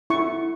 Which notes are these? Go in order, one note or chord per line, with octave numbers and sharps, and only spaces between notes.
E4 C#6